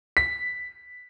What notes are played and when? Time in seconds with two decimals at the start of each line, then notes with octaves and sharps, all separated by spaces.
0.17 B6